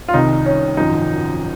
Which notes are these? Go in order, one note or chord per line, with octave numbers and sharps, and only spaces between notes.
F4
C2 C3 D#3 D#4
C#4
G#1 F#2 F3 D#4